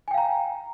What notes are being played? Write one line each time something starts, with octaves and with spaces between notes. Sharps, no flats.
F5 G5 G#5 A#5